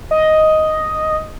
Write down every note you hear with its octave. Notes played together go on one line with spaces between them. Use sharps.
D#5